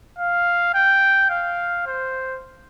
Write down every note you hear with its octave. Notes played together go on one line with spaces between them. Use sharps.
F5
G5
F5
C5